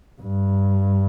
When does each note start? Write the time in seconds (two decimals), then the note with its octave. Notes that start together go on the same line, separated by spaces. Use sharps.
0.21 G2